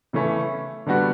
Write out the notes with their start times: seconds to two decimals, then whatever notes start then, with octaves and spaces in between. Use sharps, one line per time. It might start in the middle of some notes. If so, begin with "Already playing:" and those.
0.13 C#3 E3 A3 C#4 E4
0.86 D3 G3 B3 F#4